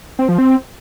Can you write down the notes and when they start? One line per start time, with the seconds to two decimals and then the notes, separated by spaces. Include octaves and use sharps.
0.19 C4
0.29 F3
0.38 C4